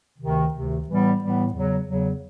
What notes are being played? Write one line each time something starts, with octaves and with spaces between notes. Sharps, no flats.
D2 C3 D#3
D2 C3 D#3
A2 E3 G3 B3
A2 E3 G3 B3
E2 C#3 F#3
E2 C#3 F#3